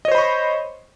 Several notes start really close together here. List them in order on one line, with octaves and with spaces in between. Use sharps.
D#5 C#5 C5 B5 C#6